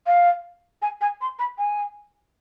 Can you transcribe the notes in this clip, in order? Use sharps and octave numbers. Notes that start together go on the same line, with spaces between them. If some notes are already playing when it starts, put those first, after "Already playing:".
F5
G#5
G#5
C6
B5
G#5